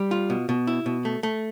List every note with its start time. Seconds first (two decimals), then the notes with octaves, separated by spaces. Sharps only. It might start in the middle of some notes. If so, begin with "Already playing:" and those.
Already playing: G3
0.11 F4
0.30 B2
0.49 B2
0.67 E4
0.86 B2
1.05 A3
1.23 A3